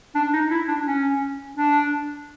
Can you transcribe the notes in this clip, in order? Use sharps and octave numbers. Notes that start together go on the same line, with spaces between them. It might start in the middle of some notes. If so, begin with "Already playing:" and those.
D4
D#4
E4
D4
C#4
D4